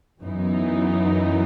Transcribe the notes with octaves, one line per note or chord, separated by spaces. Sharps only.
F#2 E3 B3 D#4